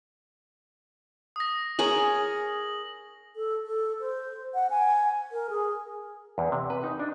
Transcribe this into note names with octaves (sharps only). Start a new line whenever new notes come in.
D#6 A#6
G#4 A#4 C#5 F#7
A4
A4
C5
F#5
G#5
A#4
G#4
E2
C3
B4
D#4
D4